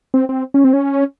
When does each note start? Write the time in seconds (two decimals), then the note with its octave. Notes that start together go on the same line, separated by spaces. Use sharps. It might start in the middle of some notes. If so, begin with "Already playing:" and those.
0.14 C4
0.29 C4
0.54 C#4
0.64 C4
0.73 C#4